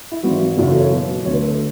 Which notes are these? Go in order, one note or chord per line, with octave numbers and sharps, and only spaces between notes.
E4
G#1 G#2 E3 F#4
F#1 F#2 C#3 E3 F#4
A4
C#5
B1 B2
D2 D3 C#5
B4
A4